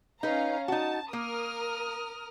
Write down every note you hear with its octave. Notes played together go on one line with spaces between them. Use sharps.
C#4 D#4 B4 F5 A#5
D#4 F#4 A5
A#3 A#4 D#6 F6